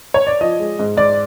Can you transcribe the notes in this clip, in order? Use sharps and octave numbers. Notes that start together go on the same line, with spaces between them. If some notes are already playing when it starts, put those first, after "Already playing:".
C#5
D5
F3 D#5
G#3
G#2
G#2 D5